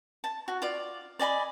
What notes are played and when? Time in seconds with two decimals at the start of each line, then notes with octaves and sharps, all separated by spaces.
0.24 A5
0.48 F#4
0.62 F4 D5
1.19 D5 D#5 G#5 B5